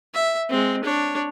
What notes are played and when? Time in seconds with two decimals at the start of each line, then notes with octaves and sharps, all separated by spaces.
0.15 E5
0.50 G#3 C4
0.84 D4 C#5